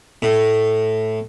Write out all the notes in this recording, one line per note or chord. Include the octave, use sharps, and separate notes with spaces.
A2